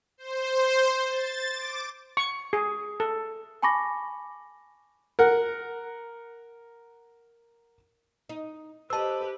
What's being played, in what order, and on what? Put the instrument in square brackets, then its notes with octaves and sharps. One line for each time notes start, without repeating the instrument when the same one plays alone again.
[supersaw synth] C5
A6
D6
[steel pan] C#6
G#4
A4
[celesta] G#5 A5 B5 C#6 D6 A#6
[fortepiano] A#4 F#5
[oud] D#4
[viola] G4 B4 [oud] C5 D#5 [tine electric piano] A5 E6